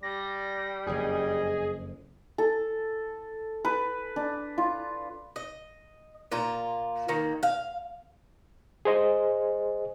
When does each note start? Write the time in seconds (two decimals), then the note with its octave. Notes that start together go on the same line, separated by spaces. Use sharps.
0.03 G3 D5 A#6
0.87 F#1 F2 G#4 D#5
2.38 A4
3.65 B4
4.16 D4
4.58 F4
5.36 D#5
6.32 A#2 F4 A#5
7.08 D#3 A#3
7.43 F5
8.85 G#4 C5 D#5 G#5